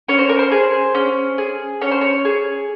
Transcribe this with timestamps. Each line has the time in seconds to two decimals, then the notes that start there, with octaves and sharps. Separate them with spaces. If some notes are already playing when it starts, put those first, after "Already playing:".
0.08 C#4 C#5
0.19 C5
0.29 A#4
0.39 C5
0.52 G#4
0.95 C#4
1.38 G#4
1.81 C#4 C#5
1.91 C5
2.01 C#5
2.25 G#4